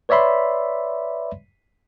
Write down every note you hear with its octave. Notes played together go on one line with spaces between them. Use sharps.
B4 C#5 D5 E5 B5 C6